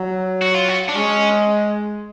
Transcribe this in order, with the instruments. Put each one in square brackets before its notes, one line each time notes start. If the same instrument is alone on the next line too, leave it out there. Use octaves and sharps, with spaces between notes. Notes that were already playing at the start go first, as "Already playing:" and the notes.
Already playing: [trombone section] F#3
[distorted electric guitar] F#4
F4
F#4
D4
[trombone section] G#3 [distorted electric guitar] C#4